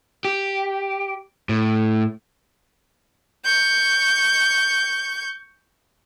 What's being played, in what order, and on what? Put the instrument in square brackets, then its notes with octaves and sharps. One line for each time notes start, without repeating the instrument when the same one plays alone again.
[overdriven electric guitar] G4
A2
[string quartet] C#6 G6